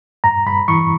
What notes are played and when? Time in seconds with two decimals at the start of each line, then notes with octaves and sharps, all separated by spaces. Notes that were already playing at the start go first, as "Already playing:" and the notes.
0.24 G2 A#5
0.47 G2 B5
0.68 E3 C#6